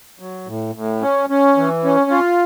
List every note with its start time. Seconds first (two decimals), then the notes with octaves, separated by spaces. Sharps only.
0.20 F#3
0.47 A2
0.75 A2
1.02 C#4
1.30 C#4
1.57 E3
1.84 C#4
2.11 F4